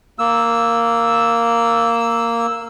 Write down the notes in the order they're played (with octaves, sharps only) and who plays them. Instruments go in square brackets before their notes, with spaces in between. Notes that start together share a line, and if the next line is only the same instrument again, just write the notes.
[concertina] A#3 E6